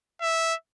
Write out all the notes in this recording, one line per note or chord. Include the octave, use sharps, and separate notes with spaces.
E5